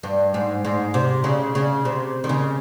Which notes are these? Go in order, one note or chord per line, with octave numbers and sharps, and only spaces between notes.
G2
G#2
G#2
C3
C#3
C#3
C3
D#3
C#3